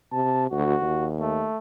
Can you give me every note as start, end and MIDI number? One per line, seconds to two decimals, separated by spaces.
0.12 0.50 48
0.12 0.44 81
0.51 0.75 38
0.51 1.07 66
0.82 1.47 39
1.20 1.58 57